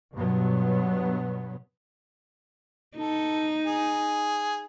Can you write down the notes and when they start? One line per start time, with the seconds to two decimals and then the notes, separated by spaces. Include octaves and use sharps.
0.14 G2 B2 F#3 B3
2.97 D#4 A4
3.66 G#4